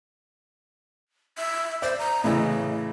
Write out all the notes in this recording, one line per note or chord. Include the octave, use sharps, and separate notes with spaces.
E5
C5 D5
A#5
A2 C#3 E3 D#5